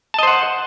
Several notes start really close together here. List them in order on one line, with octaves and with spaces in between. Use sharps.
A5 D#5 C5 F#5